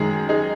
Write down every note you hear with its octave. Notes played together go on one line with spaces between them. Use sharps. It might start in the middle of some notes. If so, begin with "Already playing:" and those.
Already playing: F#2 D#3 G#3 G#4
D#4 G#4